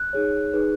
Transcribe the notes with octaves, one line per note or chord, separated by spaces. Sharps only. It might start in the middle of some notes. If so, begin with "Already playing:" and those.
Already playing: F#6
D#4 G#4 C#5
D#4 G#4 B4